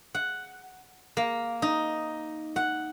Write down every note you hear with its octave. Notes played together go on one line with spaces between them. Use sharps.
F#5
A#3
D#4
F#5